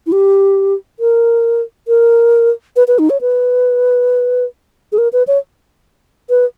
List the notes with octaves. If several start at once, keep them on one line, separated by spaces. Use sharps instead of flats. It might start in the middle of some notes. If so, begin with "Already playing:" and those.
E4
G4
A#4
A#4
B4
B4
D#4
C#5
B4
G#4
A#4
B4
C#5
B4